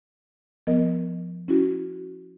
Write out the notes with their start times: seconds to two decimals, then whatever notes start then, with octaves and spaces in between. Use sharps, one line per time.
0.67 F3 B3 A#4 D#5
1.48 C#4 E4 F#4